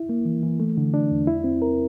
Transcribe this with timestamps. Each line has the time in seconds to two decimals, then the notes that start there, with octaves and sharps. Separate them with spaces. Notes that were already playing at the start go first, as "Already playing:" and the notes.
Already playing: E4
0.09 A#3
0.25 E3
0.43 E3
0.60 A3
0.77 D3
0.94 D4
1.11 E2
1.27 E4
1.44 C4
1.62 A#4